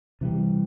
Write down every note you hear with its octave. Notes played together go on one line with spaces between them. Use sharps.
C3 E3 G3